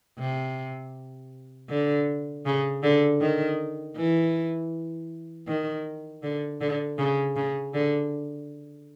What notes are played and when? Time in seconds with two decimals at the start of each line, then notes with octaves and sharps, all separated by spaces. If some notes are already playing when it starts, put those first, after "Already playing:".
0.18 C3
1.69 D3
2.45 C#3
2.83 D3
3.21 D#3
3.96 E3
5.47 D#3
6.23 D3
6.61 D3
6.98 C#3
7.36 C#3
7.74 D3